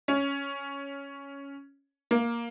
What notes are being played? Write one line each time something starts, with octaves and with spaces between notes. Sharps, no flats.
C#4
A#3